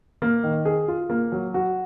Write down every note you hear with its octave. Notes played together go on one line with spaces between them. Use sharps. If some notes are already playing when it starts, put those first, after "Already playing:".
A#3
D#3
G#4
F4
A#3
F#3
F#4